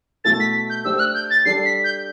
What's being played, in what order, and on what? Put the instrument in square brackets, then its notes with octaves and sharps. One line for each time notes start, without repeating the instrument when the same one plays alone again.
[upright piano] B2 A3 E4 A4 [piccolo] A6
[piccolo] B6
G6
[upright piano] A3 D4 G4 C5 [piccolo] E6
[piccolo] E6
F#6
G6
A6
[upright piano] G3 D4 A4 [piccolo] C7
[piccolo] B6
G6